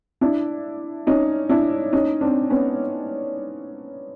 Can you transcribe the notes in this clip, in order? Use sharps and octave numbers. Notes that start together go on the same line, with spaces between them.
D4 E4
C#4 D#4
D4 E4
C#4 D#4
C4 D4
B3 C#4